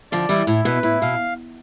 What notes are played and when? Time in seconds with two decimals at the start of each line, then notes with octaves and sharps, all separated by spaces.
0.12 D3 F3 D5
0.29 E3 G3 E4
0.47 A2 E4
0.65 B2 B4
0.83 A2 E4
1.01 B2 F5